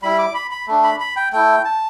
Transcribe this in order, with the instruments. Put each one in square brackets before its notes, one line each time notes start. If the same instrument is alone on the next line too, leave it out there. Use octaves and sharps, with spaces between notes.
[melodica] G3 E4 B5
D6
B5
B5
A3 D4
B5
B5
G5
A3 E4 G5
A5